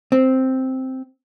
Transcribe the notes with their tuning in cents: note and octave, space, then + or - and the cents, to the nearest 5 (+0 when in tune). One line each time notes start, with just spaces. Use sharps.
C4 +0